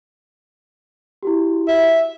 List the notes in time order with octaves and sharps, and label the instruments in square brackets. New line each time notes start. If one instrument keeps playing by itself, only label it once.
[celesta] E4 F#4 G4
[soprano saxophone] E5